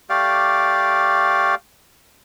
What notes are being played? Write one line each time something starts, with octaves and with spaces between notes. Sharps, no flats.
A3 G4 D5 F5